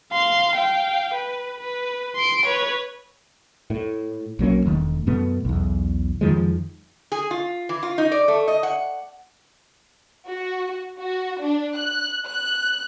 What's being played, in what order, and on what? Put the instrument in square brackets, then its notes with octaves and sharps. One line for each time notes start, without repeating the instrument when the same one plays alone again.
[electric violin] F5 C6
F5 G5
B4
B4
C6 D7
B4 C#5
[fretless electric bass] A2
B1 F#3 A#3 C#4
E1 D#3 A3
F#2 B2 A3 B3
B1 E2
F2 D#3 F3 G#3
[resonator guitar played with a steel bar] G#4
F4
E3
F4
D#4
D5
A3
D#5
F#5
[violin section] F#4
F#4
D4
F#6
F#6